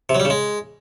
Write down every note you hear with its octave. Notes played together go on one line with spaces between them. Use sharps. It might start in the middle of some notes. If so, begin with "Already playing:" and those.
C3
F#3
G3
C#3
G#3